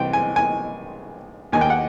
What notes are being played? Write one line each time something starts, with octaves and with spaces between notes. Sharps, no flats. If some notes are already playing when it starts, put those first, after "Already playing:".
Already playing: C2 C3 E3 G5
G#5
G#5
D#2 D#3 G#5
G5
F#5